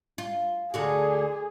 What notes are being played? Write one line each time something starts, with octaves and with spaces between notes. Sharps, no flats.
F4
D2 D3 F#4 G#4